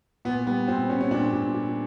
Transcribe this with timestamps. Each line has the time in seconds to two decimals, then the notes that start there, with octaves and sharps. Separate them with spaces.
0.25 A#2 B3
0.46 G3 B3
0.68 A#2 C4
0.89 A#2 C#4
1.01 C#4
1.11 A#2 D4
1.33 A#2
1.54 A#2